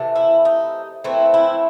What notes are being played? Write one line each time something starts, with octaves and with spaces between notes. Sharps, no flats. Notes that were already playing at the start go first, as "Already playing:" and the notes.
Already playing: C3 E3 A3
E4
D#4
E3 A3 C4 E4
E4